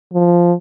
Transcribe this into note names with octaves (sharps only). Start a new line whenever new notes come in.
F3